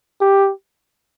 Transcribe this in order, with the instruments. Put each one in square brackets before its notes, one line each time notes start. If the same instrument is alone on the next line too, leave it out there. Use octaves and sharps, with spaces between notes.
[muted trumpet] G4